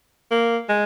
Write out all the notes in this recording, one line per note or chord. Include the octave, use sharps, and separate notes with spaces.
A#3
G#3